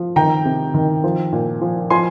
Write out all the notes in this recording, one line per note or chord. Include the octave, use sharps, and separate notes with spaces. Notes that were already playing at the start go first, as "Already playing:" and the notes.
Already playing: F3
D#3 G5 A#5
C3
D#3
F3
A#2
F3
F3 G#5 C6